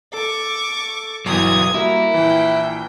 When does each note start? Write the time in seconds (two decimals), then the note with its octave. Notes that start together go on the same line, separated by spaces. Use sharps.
0.14 A4 C#6 D6
1.26 G1 E3 F#3 B3 D#6 G#6
1.74 G3 A#3 E4 F#4 A#4
2.14 A#1 E3 G5